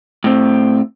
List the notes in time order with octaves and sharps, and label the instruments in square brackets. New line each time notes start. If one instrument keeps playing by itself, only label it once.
[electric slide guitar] A2 C4